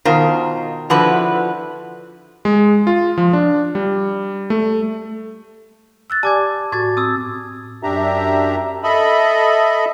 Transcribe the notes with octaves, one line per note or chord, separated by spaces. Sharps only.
B2 D#3 F4 A#4 C5
D3 F3 E4 F#4 B4
G#3
F4
F3
D4
G3
A3
E6 F#6 A6
G4 D5 G#5 A5 D6 G#6
A2 F#4 G#6 A6
C4 D#6 E6
F#2 D4 G4 E5 A#5
A4 D#5 E5 B5